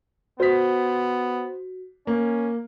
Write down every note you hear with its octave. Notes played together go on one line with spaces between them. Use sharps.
B3 F#4 C5 B6
A#3 C#4